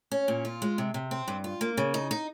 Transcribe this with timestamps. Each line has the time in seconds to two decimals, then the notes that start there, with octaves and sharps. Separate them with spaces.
0.11 C#4
0.28 A#2
0.45 F4
0.62 G#3
0.78 C3
0.94 C3
1.11 C4
1.28 G2
1.44 F4
1.61 A#3
1.77 C#3
1.94 D#4
2.11 D#4